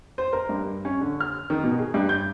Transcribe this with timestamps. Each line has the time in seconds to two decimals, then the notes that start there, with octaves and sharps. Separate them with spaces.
0.18 C5
0.33 A#4
0.49 G2
0.85 C#4
1.01 D3
1.20 F6
1.50 D#3
1.64 B2
1.79 G#4
1.94 G2
2.09 G6